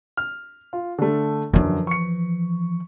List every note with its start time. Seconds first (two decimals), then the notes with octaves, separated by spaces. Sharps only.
0.17 F6
0.73 F4
0.99 D3 A3
1.53 F#2 D3 E3 F3
1.87 C#6 C#7